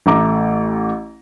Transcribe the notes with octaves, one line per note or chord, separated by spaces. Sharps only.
A1 A3 A#5 D6